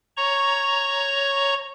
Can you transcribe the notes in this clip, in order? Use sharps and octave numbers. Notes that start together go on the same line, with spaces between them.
C#5 A#5 C#6